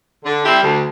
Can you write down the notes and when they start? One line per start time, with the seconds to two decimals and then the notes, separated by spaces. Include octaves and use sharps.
0.25 D3
0.45 G3 C4 E4 G4
0.63 D2